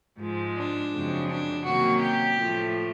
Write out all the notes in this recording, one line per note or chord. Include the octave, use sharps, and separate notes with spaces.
G#2 F3 G#3
D4
F#2 C#3 F3 G#3 C4
D4
C3 D#3 F#3 A#3 C#4 F#4
G4
A2 F3 A3